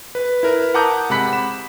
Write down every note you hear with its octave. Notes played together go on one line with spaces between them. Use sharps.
B4
E4 A#4 B4
F#5 A5 A#5 D6 D#6 G6
C3 G#3 F#5 B5 B6
E7